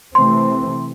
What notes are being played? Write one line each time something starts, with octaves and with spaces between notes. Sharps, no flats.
C3 E3 A3 C4 C6